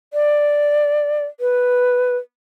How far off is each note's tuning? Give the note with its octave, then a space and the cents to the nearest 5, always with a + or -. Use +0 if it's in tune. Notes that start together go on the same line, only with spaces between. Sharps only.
D5 +5
B4 +0